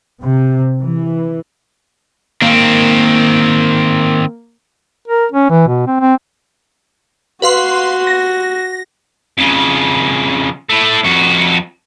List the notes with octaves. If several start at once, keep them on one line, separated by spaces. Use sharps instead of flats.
C3
E3
D#3 A#3 C4
A#4
C#4
E3
B2
C4
C4
F#4 B4 F5 C6
A#6
F2 C#3
A3 E4
F2 F#4